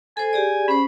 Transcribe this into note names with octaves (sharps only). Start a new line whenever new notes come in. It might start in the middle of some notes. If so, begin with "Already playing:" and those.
A4 C5 G#5
G4 G#4 D5
C#4 C5 B5